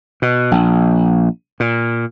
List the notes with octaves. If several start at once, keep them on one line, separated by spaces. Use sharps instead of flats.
B2
A#1
A#2